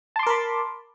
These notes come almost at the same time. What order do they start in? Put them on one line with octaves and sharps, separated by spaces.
A5 C6 D6 A#4 B5